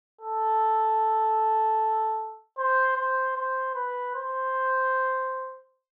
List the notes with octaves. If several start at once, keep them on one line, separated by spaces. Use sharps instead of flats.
A4
C5
C5
C5
B4
C5